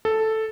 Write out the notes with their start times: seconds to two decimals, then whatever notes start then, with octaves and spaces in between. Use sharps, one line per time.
0.05 A4